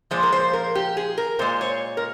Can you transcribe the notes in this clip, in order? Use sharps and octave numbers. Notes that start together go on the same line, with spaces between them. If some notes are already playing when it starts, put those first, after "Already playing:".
A#2 F3 G#3 C5
A#4
C5
A#4
G4
G#4
A#4
A#2 G#3 C5
C#5
A#4